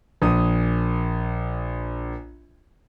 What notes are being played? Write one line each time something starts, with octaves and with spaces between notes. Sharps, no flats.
A#1 D#6